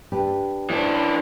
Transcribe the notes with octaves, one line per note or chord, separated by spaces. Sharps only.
D4 G4 B4
E3 C#4 D4 C5